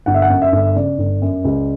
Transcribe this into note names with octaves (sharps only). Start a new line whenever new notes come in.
G1 F#5
E5
F#5
F#2
E5
G1
C#3 D5
G1
F#2
C#2